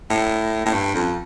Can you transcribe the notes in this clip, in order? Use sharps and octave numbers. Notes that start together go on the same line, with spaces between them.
A2
A2
G2
F2